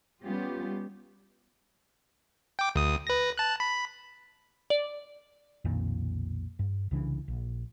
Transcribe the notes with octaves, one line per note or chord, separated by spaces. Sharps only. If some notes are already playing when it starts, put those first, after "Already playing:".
G3 B3 C#4 F4 G4
G5 D6
D2 D#6
B4 A#6
A5 F#6
B5
D5
B1 F2 A#2 D#3
G2
C2 C#3 E3 D4
A#1